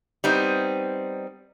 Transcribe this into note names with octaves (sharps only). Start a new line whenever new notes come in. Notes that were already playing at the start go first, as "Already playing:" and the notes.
G3 B3 C4 D#4